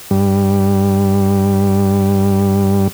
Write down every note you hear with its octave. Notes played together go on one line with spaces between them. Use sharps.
G2 G3